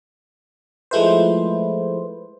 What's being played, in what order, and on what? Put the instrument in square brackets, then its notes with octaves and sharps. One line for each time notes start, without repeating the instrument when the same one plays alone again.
[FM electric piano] F3 G#3 A3 E4 B4 C5